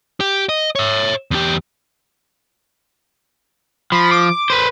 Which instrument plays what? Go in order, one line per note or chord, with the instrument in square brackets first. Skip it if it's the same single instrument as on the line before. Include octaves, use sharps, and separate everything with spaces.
[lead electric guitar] G4
D#5
C#5 E5
E2 G4
[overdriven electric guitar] F3 [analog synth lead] B5
[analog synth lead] D6
[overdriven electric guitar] B4 C5